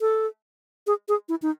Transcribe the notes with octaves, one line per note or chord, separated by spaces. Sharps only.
A4
G#4
G#4
E4
D#4